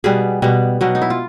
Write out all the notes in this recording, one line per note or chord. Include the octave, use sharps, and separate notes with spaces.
B2 G3 B3 G#4
B2 G3 B3
B2 F#3 B3
D#4
E4
F4